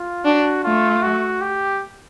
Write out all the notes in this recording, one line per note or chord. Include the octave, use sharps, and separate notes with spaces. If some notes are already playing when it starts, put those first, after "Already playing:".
Already playing: F4
D4 F#4
A3 F4
F#4
G4